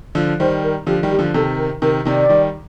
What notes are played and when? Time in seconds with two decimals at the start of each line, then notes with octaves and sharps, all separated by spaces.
0.15 D3 F3
0.39 D#3 G3 C5
0.64 A#4
0.87 D3 F3 G4
1.03 D#3 G3
1.11 G4
1.19 D3 F3
1.34 C3 D#3 A4
1.58 A#4
1.82 C3 D#3 A#4
2.05 C3 D#3 D5
2.29 D#3 G3